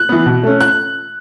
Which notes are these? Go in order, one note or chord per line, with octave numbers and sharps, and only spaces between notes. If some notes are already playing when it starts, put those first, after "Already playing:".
Already playing: F#6
E3 B3
B2
A3 C#4
F#6